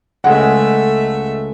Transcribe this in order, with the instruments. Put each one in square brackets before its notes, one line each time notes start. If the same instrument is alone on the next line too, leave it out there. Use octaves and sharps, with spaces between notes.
[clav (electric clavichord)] C#2 G#3 [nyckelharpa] A3 E5 [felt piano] F#5